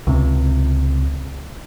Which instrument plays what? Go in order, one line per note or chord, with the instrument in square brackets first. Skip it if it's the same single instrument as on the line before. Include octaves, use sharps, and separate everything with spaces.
[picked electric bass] C#2 C3